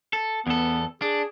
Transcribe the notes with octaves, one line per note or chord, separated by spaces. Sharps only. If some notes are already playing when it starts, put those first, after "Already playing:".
A4
E2 B3 A4
D4 G#4